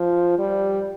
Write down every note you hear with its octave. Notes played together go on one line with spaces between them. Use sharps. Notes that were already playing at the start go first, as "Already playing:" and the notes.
Already playing: F3
G3